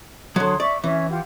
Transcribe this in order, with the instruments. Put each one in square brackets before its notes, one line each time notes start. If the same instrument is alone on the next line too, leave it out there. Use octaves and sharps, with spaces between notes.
[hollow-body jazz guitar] D3 F#3 [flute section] C#5 C6 D#6
[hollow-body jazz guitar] D5 [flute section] E5 C#6
[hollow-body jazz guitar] E3 [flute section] C#4 E5
[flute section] F4 G4 F#5